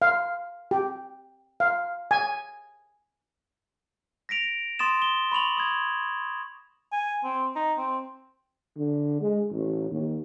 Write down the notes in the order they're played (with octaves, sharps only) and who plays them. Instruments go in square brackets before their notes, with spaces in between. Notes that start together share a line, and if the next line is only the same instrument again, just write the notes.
[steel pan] F5
G4
F5
G#5
[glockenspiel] A#6 B6 D7 F7
C6 D#6 A6 E7
G7
B5 C#6 F7 F#7
D#6 G#6
[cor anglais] G#5
C4
D#4
C4
[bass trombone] D3
G#3
A1
D#2